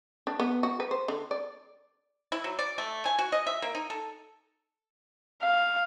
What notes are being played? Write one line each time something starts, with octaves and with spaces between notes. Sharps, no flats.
D4
B3
F#4
B4
C5
D3
D5
E4
F#3
D5
A3
G#5
F#4
D#5
E5
A#3
D#4
A4
F5